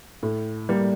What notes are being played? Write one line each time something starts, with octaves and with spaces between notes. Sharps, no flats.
A2
G3 A#3